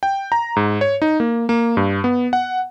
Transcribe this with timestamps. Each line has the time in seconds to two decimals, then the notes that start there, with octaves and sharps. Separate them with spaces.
0.03 G5
0.32 A#5
0.56 G#2
0.81 C#5
1.02 D#4
1.20 A#3
1.49 A#3
1.77 G2
2.04 B3
2.33 F#5